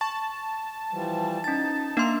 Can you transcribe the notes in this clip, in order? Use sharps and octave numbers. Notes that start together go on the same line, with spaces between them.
A5 C#6
E3 F3 G3
C#4 D#4 A6
A#3 D4 E5 C6